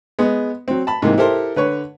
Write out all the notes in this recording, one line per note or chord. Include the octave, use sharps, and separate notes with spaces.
G#3 B3
F#3 C4
A5 B5
G#2 C3 E3 A#3
E4 G4 A4 A#4 C5
D3 B4 C#5